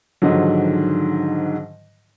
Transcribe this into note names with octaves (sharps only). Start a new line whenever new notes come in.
G#2 D3 D#3 F3 F#3